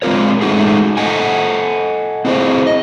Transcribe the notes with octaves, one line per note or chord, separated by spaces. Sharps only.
G#3 C4 F4 A#4 C#5
G#3 A3 C#4 D#4 F#4 G#4
A4 D#5 F#5 G#5
C4 E4 G#4 A#4 C5
D#5